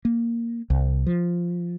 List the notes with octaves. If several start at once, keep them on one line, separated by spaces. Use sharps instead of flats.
A#3
C2
F3